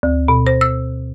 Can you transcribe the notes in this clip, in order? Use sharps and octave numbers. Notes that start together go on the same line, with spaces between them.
D2
B2
C5
E6